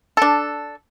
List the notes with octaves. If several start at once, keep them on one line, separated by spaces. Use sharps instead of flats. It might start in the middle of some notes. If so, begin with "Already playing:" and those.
D4 A4